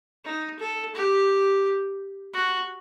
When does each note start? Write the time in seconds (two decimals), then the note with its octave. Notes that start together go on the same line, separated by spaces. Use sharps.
0.25 D#4
0.59 A4
0.94 G4
2.34 F#4